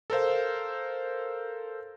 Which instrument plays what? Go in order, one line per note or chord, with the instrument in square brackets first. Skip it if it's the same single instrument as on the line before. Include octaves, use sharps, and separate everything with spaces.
[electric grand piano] A4 A#4 C5 F5